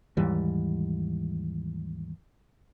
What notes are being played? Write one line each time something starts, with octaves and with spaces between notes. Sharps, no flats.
D#2 G#2 E3 G3